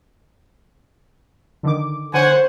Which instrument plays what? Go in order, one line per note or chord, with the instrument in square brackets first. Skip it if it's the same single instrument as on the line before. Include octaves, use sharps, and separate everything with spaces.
[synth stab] D3 D#3 D6
[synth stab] D3 [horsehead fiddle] C5 [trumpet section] C#5 F#5 G#5